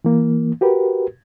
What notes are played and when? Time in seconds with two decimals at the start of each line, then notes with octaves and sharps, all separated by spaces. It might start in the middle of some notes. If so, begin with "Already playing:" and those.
0.05 E3 A#3
0.61 F#4 G4 A#4 B4